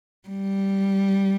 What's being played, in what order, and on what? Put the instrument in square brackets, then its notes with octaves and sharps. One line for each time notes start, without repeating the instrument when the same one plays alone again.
[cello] G3